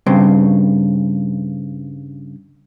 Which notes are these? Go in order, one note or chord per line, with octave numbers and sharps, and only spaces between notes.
G2 C#3 C4